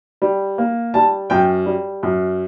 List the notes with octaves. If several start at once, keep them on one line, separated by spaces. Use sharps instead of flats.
G3
A#3
G3 A5
F#2 G5
G3
F#2